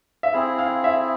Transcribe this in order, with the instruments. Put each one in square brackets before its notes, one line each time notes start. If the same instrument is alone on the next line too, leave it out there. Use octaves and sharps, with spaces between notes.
[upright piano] E5
[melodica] C4 E4 G#4 [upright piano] F5
[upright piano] F5
E5